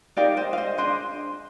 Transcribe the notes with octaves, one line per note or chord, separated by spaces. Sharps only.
D#4 G4 A#4 D5 F5
C5 D#5
F5
C5 D#5
D4 G#4 C5 D#5